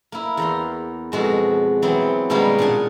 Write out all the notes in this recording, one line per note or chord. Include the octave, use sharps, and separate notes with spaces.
A#3 E4
E2 A#5 C6
F2 B2 G#3 F#4
E3 F#3 B3 C4
B2 D#3 G3 G#3 A#3 C#4
A#2 D4 G#4 G#5 A5